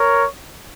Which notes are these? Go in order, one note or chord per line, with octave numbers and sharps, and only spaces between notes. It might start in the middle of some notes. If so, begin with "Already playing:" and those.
Already playing: A#4 C#5